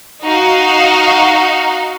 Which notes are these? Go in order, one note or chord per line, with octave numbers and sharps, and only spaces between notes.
D#4 F#4 F5